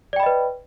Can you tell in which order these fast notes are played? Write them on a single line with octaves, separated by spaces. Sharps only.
D5 G5 B5 D#5 B4